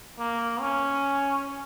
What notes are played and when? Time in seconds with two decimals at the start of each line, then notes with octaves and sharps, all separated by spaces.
0.19 A#3
0.61 C#4